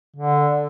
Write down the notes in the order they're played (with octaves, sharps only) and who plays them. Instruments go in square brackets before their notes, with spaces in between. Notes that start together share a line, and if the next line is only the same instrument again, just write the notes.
[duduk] D3